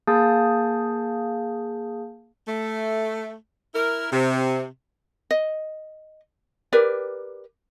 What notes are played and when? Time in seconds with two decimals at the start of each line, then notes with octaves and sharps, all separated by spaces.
0.08 A#3 G#4 F5 A5 D#6 G6
2.47 A3
3.74 E4 A#4
4.12 C3
5.31 D#5
6.73 G4 A#4 B4 D5